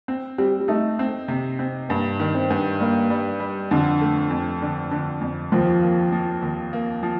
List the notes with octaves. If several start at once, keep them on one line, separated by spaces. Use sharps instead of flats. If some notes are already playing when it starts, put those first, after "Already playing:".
C4
G3 C4
G3
A3 D#4
C4
C3
C4
G2 A#3
D#3
C4
G2
G3 A#3
G3
G3
F2 D3
A3
F2
D3
D3
F2
D#2 F3
A#3
F3
D#2
A#3
F3